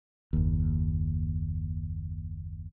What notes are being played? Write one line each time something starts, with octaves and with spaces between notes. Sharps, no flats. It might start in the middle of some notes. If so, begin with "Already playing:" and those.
F#1 D#2